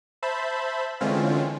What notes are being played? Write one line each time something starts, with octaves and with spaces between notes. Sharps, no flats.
C5 E5 A5 B5
D3 E3 G#3 C4 C#4 F4